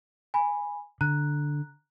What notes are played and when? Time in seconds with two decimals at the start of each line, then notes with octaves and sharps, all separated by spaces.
0.34 G#5 B5
1.01 D3 A#5 F#6